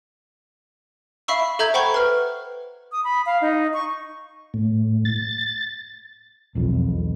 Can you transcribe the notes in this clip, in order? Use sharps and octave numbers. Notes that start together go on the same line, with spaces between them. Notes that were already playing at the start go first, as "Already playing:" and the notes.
E5 F5 B5 C#6 E6
A4 E5 A#5 G6 G#6
C5 F#5 G5 B5 C#6
B4 F6
D#6
B5
F5
D#4
C#6
A2
A6
E1 B1 F2